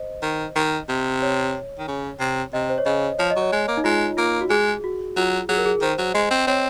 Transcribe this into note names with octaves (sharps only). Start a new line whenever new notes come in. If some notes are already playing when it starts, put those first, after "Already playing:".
Already playing: C5 D#5
D#3
D#3
C3
C#5
D#3
C#3
C3
C3 D#5
C5
C#5
C#3 D#5
F3 C#5
D#5
F#3
C#5
G#3
A#3
D#4
G#3 F4
A#3 F4
F#4
G#3 G#4
F#4
F#3 F4
F#3 G#4
A#4
G#4
D#3 C5
F#3
G#3 D#5
C4
C4 C#5